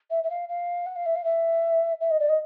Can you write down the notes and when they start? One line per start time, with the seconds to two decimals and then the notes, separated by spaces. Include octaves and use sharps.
0.11 E5
0.24 E5
0.30 F5
0.49 F5
0.86 F#5
0.96 F5
1.06 E5
1.16 F5
1.24 E5
2.01 E5
2.11 D#5
2.20 D5
2.29 D#5